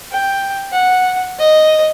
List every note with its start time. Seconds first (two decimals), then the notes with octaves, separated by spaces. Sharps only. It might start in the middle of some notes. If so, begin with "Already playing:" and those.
0.11 G5
0.72 F#5
1.39 D#5